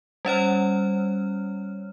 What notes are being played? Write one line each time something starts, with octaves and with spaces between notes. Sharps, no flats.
G3 C#4 C#5 F6